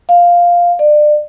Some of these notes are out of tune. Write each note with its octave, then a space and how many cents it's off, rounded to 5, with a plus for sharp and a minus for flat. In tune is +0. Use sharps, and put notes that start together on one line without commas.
F5 +0
D5 +30